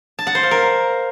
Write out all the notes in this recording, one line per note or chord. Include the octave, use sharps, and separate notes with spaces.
A5
F#5
C5
F5
A#4